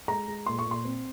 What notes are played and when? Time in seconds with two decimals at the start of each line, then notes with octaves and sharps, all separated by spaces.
0.08 G#3 A#5
0.28 G#3
0.46 A#2 C6
0.59 C#6
0.66 A#2
0.71 C6
0.85 C4